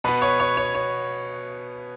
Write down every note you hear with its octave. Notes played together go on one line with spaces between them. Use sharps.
B2 B3 B4
C#5
C#5
C#5
C#5